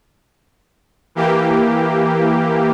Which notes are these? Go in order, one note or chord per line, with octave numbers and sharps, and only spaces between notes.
E3 A#3 G4